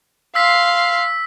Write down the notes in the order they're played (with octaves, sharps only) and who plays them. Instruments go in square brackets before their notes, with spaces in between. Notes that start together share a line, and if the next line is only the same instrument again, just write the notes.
[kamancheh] F5 C6 [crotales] E6 B6